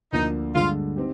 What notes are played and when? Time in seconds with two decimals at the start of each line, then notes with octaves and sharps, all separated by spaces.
0.13 D2 D3 F3 A#3 D#4
0.55 G2 D3 G#3 F4
0.96 C4 D#4 G4